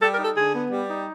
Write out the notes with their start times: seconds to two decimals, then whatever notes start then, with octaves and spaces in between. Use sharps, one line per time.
0.01 G3 A4
0.13 A#4
0.19 D#4
0.24 A4
0.36 D3 G#4
0.54 B3
0.71 G3
0.88 D#4